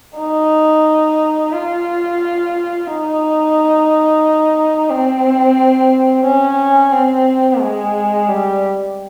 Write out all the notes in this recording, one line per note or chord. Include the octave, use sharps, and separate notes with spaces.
D#4
F4
D#4
C4
C#4
C4
G#3
G3